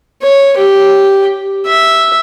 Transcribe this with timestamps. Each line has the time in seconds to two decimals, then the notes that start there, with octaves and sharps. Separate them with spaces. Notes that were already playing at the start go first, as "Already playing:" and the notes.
0.22 C#5
0.57 G4
1.66 E5